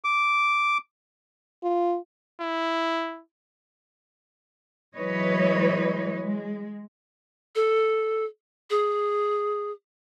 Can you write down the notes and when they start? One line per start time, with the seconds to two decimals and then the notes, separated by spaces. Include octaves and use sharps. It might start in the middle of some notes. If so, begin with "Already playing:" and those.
0.04 D6
1.63 F4
2.41 E4
4.94 E3 F#3 G#3 B4 C#5 D#5
6.18 G#3
7.55 A4
8.70 G#4